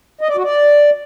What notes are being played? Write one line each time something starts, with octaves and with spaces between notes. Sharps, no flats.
D#5
D5
F#4
D5